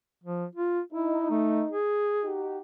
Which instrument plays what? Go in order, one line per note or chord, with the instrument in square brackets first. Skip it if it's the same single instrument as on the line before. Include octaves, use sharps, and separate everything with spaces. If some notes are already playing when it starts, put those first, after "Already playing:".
[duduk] F3
F4
[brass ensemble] D#4 [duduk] E4
[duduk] A3
G#4
[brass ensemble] D#4 F#4 G4